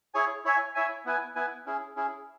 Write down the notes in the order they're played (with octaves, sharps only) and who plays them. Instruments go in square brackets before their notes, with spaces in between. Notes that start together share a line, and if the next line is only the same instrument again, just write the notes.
[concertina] E4 G#4 C#5 G#5
E4 C#5 E5 G#5
E4 C#5 E5 G#5
B3 E4 B4 G#5
B3 E4 B4 G#5
C#4 E4 G#4
C#4 E4 G#4